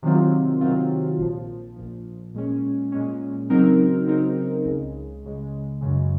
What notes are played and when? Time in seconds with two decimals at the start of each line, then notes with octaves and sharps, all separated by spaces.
0.02 C3 D#3 F#3 C4 F4
0.61 C3 D#3 F#3 C4 F4
1.18 A#1 A#2 F3
1.76 A#1 A#2 F3
2.34 A#2 G#3 C#4
2.92 A#2 G#3 C#4
3.50 C#3 F#3 C4 D#4 A#4
4.08 C#3 F#3 C4 D#4 A#4
4.65 C#2 C#3 G#3
5.23 C#2 C#3 G#3
5.81 F#2 C#3 G#3